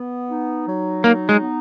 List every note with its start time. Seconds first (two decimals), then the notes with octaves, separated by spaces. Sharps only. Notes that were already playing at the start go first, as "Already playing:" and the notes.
Already playing: B3
0.30 D#4
0.67 F#3
1.04 A#3 D#4
1.29 G#3
1.41 B3